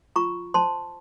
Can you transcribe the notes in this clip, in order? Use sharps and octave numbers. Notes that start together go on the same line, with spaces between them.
F4 A#5 C#6
C5 A5 C6